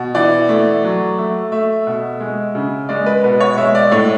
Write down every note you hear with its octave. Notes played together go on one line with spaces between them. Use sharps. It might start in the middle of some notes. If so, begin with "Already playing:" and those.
Already playing: B2
E3 D5
A3
F#3
A3
A3 E5
B2
G#3
C#3
G#3 D5
B4
B2 B4
C#5
G#3 E5
D5
A2 C#5